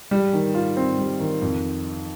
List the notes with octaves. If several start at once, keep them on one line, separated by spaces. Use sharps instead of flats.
G3
D#3
F4
C4
G3
D#3
F2